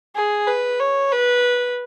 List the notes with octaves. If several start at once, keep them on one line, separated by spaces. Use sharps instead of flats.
G#4
B4
C#5
B4